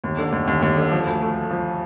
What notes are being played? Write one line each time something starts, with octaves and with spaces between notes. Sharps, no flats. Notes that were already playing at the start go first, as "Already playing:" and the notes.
D#2
D3
D#2
D#2
D#2
D3
F3
D2
A3
A3
F3